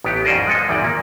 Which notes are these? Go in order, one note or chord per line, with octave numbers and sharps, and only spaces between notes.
A1 B3 G4
F2 G#2 C#4 C5 D5 D#5
F3 G#3 A4 D#5
G#1 E2 G3 D5 G5
A#2 A#3